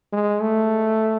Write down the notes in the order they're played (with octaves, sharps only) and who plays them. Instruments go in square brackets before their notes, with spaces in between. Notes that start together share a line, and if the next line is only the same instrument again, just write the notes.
[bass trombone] G#3
A3